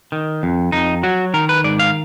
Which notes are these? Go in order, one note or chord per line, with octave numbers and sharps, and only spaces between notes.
D#3
F2
F2 D#4
F#3 F#4
D#3 A#4
B4
G#2 D5
F5